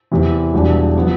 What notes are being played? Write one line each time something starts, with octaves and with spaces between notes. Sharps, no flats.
E2 C3 E3
E1 E2 B2 G3 D4
F3 B3